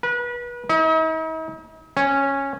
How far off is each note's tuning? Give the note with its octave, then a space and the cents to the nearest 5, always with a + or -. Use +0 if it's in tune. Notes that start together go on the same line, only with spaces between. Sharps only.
B4 -30
D#4 +45
C#4 -10